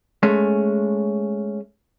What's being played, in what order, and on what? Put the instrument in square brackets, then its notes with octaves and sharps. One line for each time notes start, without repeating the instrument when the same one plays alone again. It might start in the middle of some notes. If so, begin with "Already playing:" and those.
[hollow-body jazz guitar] G#3 A3 C#4